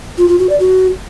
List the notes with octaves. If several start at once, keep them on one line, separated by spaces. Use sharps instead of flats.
F4
F4
F#4
D5
F#4